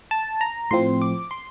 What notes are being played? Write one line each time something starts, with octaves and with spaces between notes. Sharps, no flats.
A5
A#5
A2 F3 C4 C6
D6
C6